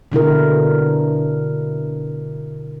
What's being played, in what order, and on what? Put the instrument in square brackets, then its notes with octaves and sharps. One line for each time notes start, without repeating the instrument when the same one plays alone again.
[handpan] B2 D3 E4 A#4